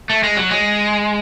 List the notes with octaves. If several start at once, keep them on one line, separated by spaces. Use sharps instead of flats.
A3
G#3
F#3
G#3